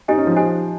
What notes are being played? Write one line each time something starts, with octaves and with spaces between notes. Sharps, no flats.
D#4 G4 C5 D#5 G#5
C#4
F3
G4 C5 D#5 G#5